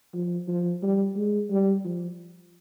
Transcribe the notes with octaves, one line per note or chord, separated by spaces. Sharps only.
F3
F3
G3
G#3
G3
F3